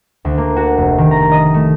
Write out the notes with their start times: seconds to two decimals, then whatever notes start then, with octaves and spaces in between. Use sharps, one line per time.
0.25 D2
0.38 A#3
0.56 F#4
0.77 F1
0.98 D#3
1.11 A#5
1.32 D#5
1.54 A3